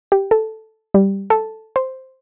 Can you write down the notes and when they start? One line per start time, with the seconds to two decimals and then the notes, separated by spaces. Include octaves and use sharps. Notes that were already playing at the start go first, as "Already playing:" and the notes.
0.12 G4
0.31 A4
0.94 G3
1.30 A4
1.76 C5